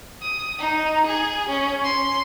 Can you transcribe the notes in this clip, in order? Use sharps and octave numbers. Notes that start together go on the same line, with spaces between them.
D#6
D#4
G#4
C#4
C6